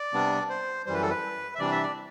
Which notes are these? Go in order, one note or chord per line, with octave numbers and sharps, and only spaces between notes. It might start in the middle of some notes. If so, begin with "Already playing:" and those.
Already playing: D5
C3 G3 B3 D4
C5
F#2 E3 G3 C5
B4
A4
B4
E5
C3 E3 G3 D4 D5
E5
D5